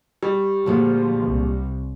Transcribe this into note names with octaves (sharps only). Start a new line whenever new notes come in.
G3 G4
D2 A#2 F3 G#3
C2